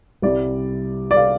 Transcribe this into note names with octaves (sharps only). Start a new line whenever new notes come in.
C2 C3 G3 D5
D5
F5